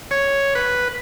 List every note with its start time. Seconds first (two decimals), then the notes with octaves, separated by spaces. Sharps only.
0.11 C#5
0.55 B4